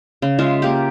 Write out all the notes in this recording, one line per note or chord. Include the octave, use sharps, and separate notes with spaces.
C#3
G#3 F4 E5
A#3 G4